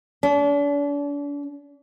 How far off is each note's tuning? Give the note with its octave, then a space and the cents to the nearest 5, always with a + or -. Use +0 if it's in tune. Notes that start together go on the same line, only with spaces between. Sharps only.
D4 -40